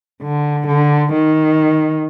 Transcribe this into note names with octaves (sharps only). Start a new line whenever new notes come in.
D3
D3
D#3